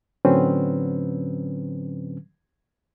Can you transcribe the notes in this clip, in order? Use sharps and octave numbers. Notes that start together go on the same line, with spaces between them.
A2 D3 F#3 C4 C#4 B4